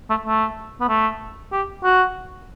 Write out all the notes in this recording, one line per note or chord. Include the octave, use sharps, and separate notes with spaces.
A3
A3
B3
A3
G4
F#4